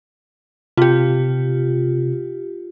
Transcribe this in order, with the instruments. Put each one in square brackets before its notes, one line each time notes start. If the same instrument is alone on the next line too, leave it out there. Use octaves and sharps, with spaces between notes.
[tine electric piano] C3 [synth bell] F4 G4